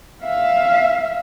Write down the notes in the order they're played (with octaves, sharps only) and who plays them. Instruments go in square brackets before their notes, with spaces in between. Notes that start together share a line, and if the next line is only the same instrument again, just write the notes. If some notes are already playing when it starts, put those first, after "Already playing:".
[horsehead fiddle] E5 F5